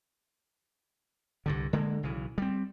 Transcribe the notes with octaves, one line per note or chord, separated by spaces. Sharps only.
C2 G2 D3
D3 G#3 A#3
B1 C#3 E3
G3 C4